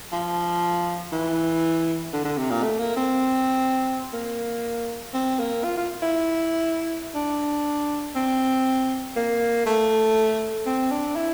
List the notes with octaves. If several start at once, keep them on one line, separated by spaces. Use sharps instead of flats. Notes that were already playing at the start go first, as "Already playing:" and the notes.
F3
E3
D3
D3
C3
A#2
A3
A#3
C4
A#3
C4
A#3
F4
F4
E4
D4
C4
A#3
A3
C4
D4
E4